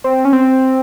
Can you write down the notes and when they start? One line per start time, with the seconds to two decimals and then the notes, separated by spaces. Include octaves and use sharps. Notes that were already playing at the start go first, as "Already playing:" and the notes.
0.04 C4
0.25 C#4
0.33 C4